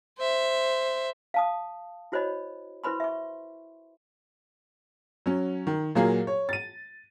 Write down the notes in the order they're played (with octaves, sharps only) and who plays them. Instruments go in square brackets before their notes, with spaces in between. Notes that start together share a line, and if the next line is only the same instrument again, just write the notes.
[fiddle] C5 E5
[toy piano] F5 A5 D#6
E4 F#4 C5 C#5 D#5 B5
E4 B4 C5 B5 C6
E5 C#6
[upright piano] F#3 C#4
D#3
A#2 F#3 A#3 G#4
C#5
A6 D#7